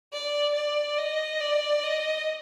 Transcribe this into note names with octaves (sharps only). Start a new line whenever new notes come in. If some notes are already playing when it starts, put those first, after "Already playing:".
D5
D5
D#5
D5
D#5